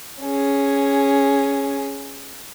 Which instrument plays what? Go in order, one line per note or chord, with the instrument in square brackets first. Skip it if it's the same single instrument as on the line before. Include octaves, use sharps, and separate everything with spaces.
[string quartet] C#4 G#4